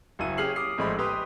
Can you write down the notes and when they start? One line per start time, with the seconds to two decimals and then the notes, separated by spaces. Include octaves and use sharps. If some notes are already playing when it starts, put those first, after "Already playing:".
0.19 F#1 F#3 E4 D#7
0.38 C#4 G4 G#4 F6 C7 F#7
0.56 D6 D#6 C7
0.78 A#1 A2 G#3 C5 B5
0.99 G4 B4 C6 D#6